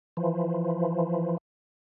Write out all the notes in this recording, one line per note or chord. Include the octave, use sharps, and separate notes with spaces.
E3 F3